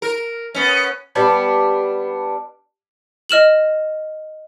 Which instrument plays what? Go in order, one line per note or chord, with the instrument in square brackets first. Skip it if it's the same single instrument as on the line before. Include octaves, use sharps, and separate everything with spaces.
[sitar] A#4
B3 C#4
[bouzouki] G3 B3 D4
[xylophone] D#5 F6 E7 F#7